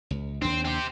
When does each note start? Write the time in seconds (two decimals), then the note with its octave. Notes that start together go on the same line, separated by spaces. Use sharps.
0.11 C#2
0.42 D#2 C4 D4
0.65 C4 G4